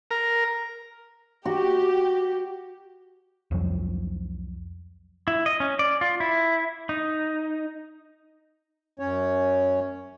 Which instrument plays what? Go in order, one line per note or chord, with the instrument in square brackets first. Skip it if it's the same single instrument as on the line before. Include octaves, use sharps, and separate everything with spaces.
[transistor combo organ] A#4
[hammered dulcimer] F#4 [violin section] G4
[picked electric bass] C2 F2 F3 F#3
[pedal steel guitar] E4
D#5
C#4
D5
F4
E4
D#4
[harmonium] F#2 C#4 C#5